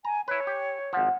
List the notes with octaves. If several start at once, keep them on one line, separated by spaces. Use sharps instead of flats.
G#5 A#5
E4 B4 C#5
G4
G#1 F3 F#5